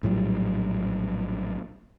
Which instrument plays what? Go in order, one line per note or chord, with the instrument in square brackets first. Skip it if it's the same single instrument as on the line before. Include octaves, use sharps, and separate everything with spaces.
[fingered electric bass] A#1 A2 F#3 G3